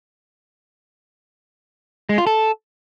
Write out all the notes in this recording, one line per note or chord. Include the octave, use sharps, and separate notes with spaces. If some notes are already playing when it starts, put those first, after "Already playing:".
G#3
F4
A4